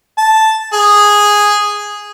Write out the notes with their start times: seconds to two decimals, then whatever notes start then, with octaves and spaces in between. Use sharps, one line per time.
0.18 A5
0.73 G#4